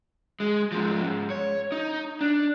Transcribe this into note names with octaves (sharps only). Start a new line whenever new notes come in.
G#3
G#2 F3
F2 G#2
C#5
D#4
D4